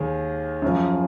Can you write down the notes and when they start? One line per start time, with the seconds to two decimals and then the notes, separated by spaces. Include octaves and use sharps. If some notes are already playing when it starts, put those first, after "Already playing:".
Already playing: D#2 D#3 G#4
0.62 F#2 F3